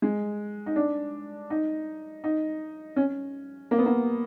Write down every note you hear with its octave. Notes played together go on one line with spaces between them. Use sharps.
G#3
D#4
D4
D#4
D#4
C#4
A#3
B3
A#3